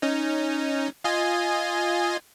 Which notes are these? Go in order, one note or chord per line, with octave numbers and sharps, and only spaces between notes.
C#4 D#4
F4 D#5 G#5